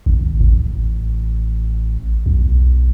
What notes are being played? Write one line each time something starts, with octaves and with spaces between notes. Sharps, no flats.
G#1
A1
B1